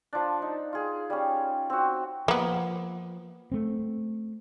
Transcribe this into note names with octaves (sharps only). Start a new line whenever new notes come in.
F3 D4
D#4
F4 G#4
G3 C#4
C4 F#4
F3 A#3 B3
A3 C4